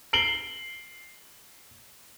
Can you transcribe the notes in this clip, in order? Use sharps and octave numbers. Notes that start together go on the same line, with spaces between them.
C7 D7 F#7 G7